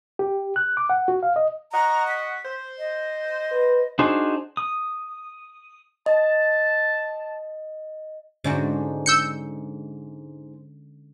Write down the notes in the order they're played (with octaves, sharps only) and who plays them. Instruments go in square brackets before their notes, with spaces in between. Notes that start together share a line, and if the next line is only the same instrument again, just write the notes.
[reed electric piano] G4
F#6
D6
F#5
F#4
F5
D#5
[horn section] F#4 D#5 F#5 [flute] A#5
[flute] B6
[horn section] C5
[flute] D#5
[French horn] B4
[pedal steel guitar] D4 D#4 F#4 G#4 C5
D#6
[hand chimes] D#5 [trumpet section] A5
[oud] G#2 D4 F#4 [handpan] D3 G#3 C#4
[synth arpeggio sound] E6 G6 C#7